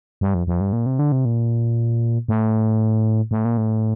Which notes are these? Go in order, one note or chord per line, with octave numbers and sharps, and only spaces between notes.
G2
F2
F2
G2
A#2
C3
D3
C3
A#2
A2
A2
A#2
A2